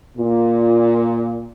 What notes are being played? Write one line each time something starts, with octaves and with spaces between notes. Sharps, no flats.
A#2